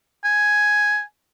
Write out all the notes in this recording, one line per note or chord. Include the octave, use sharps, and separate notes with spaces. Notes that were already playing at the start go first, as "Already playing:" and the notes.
G#5